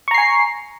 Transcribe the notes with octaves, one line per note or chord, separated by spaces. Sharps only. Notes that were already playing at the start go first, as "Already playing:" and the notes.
G#5 A#5 C#6 C7